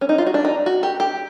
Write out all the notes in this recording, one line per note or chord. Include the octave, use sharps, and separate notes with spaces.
C#4
D#4
F4
F#4
D4
D#4
F#4
G4
G4